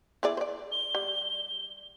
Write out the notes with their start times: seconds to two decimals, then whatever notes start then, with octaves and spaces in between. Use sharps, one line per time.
0.23 E4 G#4 D5
0.37 C5 D5
0.72 G7
0.95 G3